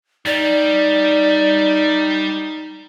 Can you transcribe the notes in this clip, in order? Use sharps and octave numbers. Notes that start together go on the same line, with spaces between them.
G3 D#4 D5